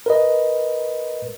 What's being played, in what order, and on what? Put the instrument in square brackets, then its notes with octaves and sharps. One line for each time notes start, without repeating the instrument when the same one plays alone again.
[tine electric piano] A#4 B4 D#5